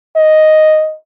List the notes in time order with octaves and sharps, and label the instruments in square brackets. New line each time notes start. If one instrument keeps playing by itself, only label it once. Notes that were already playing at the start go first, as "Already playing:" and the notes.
[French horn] D#5